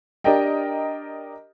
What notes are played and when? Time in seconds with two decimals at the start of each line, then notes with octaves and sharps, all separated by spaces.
0.24 D4 G4 A#4 D#5 G5